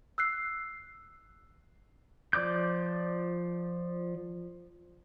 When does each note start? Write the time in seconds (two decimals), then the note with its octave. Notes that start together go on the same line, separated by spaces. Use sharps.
0.18 E6 F#6 C7
2.33 F3 D5 D6 G6